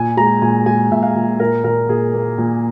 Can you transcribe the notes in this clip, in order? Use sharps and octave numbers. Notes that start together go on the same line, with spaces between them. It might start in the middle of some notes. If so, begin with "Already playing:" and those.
Already playing: A#2 G#5
G#3 A#5
A#2 G#5
G#3 G#5
A#2 E5
F5
A#2
A#2 A#4
A#2 A#4
A#2 G#4
A#3
A#2